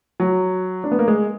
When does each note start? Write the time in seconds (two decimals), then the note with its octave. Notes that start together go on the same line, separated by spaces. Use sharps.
0.20 F#3
0.84 D4
0.91 B3
0.99 A#3
1.08 G#3